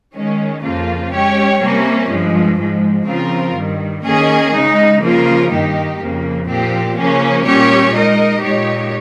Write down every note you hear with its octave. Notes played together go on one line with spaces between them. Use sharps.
D#3 G#3 C#4
F2 C#3 F3 A#3 F4
G#3 C#4 G4 C#5
C3 G3 A#3 C#4
G2 F3 G#3
G#2 F3 G#3
C#3 F3 C4 F4 A#4
G2 D#3 G3
D#3 A#3 C#4 G#4 D#5
C#3 G#3 D#4
C#3 F3 A#3 F4 A#4
G2 D#3 A#3 D#4 G4
F2 C#3 F3 A#3
A#2 F3 C4 G4
C#3 F3 A#3 C#4
A#2 G3 C#4 G4 C#5
G#3 D#4 A#4 D#5
A#2 G#3 D#4 G4 C#5